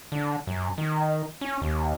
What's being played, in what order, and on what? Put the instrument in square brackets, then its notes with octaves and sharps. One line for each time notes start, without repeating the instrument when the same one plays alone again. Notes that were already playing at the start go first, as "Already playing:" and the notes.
[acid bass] D3
F#2
D#3
C#4
D#2